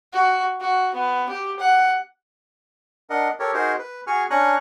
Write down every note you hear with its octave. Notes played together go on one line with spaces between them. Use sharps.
F#4
F#4
B3
G4
F#5
D4 A#4 D#5 F#5
G4 A4 A#4 C#5
D#4 F#4 G#4 A#4 C5
B4
F#4 G#4 G#5 C#6 F6
C#4 D4 G#5 A#5 C#6 F#6